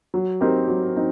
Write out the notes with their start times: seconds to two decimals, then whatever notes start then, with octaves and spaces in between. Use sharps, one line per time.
0.14 F#3
0.41 C4 D#4 G4 A#4
0.68 F#3
0.96 C4 D#4